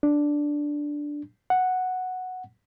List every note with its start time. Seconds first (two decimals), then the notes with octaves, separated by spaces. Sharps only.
0.03 D4
1.50 F#5